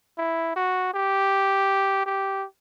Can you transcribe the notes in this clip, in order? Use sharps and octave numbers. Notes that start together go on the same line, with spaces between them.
E4
F#4
G4
G4